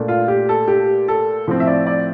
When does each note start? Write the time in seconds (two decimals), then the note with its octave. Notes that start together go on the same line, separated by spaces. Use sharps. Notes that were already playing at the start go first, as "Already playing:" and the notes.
Already playing: A#2 A3 D4
0.08 F4
0.28 G4
0.49 A4
0.68 G4
1.08 A4
1.47 A2 F3 A3 C4
1.60 E5
1.67 D5
1.86 D5